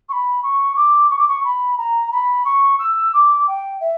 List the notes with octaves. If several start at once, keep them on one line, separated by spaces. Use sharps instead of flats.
C#6
B5
C#6
D6
C#6
D6
C#6
B5
A#5
B5
C#6
E6
D6
G5
E5